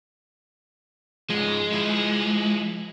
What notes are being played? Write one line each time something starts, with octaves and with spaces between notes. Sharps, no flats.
G#2 F3 G#3
F3 E4